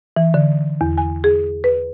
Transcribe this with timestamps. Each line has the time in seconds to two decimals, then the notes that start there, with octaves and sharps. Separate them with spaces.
0.16 E3
0.34 D3
0.81 E2
0.98 G#5
1.24 G#4
1.64 B4